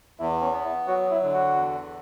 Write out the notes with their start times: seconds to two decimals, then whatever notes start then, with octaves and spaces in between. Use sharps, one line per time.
0.19 E2 E4
0.42 C#4
0.53 B3
0.65 E4
0.87 F#3 F#4
1.11 E4
1.23 D3
1.34 F#4
1.56 E2